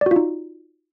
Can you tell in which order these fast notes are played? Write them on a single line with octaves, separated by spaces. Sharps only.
D5 F#4 F4 D#4